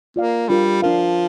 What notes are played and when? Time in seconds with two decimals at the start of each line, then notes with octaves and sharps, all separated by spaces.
0.16 A#3 F4 D5 F5
0.49 G3 D4 F4 A#4
0.82 F3 D4 A#4 F5